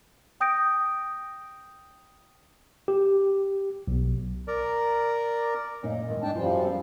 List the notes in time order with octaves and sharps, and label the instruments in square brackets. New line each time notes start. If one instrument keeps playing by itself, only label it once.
[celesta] G5 D#6 G6 A#6 D7
[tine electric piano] G4
B1
[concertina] A#4 D5 A#5
[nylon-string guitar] F#2 A#2 D#4
E2 G#2 D#3
[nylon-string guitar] G#2 D#4 [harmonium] D4 G5 A5
[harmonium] F#2 F3 G3 [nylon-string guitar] E3 F4
[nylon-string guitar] A4 C5 F5